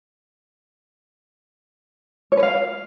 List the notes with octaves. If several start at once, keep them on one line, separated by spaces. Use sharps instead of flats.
C#5
B4
F5